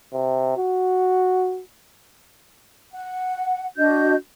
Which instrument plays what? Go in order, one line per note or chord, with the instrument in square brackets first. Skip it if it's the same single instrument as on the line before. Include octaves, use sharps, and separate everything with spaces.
[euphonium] C3
F#4
[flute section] F#5
D4 F#4 D#5 G6